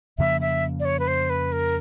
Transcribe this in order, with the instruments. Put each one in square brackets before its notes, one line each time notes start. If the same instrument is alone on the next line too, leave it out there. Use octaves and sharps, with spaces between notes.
[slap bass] F2 C#3 F3 A#3 [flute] E5
[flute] E5
D5
C#5
B4
C5
B4
A#4